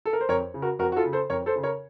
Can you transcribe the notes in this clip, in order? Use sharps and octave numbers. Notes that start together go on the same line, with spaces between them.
A4
A#4
C5
F2 A#4 C#5
C#3
F#4 A#4
F2 F#4 A#4
F#4
F4 A4
C#3
A4 C5
F2 A#4 C#5
A4 C5
C#3
A#4 C#5